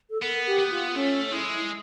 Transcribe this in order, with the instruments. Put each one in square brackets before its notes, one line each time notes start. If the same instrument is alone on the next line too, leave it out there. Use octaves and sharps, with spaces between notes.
[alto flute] A4
[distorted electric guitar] B3 [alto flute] A#4
[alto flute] G4
[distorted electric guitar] B3
[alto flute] F4
[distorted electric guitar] A3 [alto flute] C#4
[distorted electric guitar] G#3 [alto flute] E4